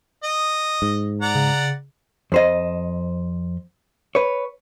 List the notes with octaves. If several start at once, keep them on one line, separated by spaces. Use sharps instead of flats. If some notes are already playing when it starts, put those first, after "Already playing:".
D#5
G#2
D5 F#5 A#5
C#3
F2 C5 D#5
B4 C#5